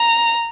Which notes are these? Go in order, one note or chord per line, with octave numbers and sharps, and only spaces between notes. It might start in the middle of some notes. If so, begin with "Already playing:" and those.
Already playing: A#5